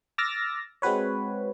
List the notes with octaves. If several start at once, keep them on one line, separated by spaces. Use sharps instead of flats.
D6 E6 F6 A6 A#6
G#3 C4 F#4 B4 C#5